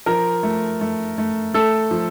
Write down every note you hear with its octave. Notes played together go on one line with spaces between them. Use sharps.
F3 A#4
A3
A3
A3
A3 A4
F3